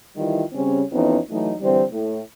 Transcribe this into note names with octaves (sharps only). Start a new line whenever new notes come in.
D#3 E3 G3 E4 F4
C#3 G3 C4 C#4
F2 E3 B3 C#4 D#4
E3 F#3 A3 D#4
D3 E3 G3 C4
A2